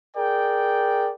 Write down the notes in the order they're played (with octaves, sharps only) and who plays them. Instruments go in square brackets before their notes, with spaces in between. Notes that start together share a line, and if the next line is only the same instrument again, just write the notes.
[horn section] G#4 A#4 D5 G5